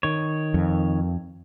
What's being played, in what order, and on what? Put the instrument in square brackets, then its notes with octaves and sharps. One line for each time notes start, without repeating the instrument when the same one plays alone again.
[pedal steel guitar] D#3 C#5
[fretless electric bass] F2